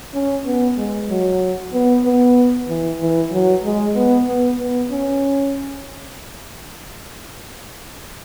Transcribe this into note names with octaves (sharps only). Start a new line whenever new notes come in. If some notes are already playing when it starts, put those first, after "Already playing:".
C#4
B3
G#3
F#3
B3
B3
E3
E3
F#3
G#3
B3
B3
B3
C#4